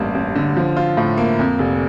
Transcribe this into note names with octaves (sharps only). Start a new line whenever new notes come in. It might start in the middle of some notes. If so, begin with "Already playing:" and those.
Already playing: A1 G2 A#3
A1
D3
F3
F4
A2
A#3
F2
F1